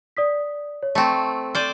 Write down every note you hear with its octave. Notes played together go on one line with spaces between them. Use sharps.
D5 D#6 B6
C#5
A3 C4 C#6
C5 D5 F6 G6 D#7